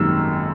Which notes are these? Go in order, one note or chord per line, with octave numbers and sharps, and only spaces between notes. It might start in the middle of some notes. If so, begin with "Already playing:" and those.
Already playing: G#1 F#2 D#3 G3 A#3 E6